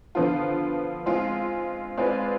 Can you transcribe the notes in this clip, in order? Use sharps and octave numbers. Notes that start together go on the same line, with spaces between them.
D3 F3 B3 F4
G#3 C4 F4
G#3 C4 F4 B4 D5